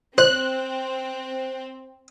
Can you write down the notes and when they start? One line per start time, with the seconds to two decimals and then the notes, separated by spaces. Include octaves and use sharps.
0.18 C4 C5 F#6